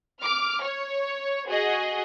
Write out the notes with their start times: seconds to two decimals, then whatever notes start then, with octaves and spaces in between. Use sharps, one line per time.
0.22 D6 F6
0.64 C#5
1.48 F#4 G#4 D#5